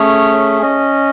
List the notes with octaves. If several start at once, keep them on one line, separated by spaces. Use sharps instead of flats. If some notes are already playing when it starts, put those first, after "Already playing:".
Already playing: A3 C#4 G#4 C#5
C#4 D#5